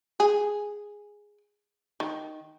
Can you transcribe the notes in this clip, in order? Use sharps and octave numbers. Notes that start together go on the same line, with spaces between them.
G#4
D#3